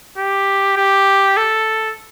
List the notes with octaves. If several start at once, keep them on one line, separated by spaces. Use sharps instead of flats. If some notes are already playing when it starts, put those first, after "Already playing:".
G4
G4
A4